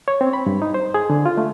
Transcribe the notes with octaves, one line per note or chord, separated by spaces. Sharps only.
C#5
C4
B5
G2
D#4
C5
G#4
D3
F4
A3